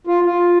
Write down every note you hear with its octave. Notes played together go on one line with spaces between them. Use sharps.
F4
F4